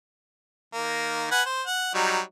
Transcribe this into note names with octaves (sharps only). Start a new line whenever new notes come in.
D#3 A#3
B4 F#5 G#5
C5
F#5
F#3 G3 D#4